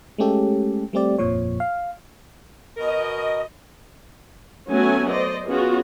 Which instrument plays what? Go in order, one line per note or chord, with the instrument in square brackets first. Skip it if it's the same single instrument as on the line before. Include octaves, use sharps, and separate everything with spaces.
[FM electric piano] G#3 A3 C#4 G4 A4
G3 A3 C4 G4 D5
G1 F2 A#2 F3 C#5
F5
[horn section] B2 A#4 [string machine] D#5
[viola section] F#3 A3 B3 C#4 F#4 G#5
C5 D5 D#5
B3 C#4 F4 F#4 G#4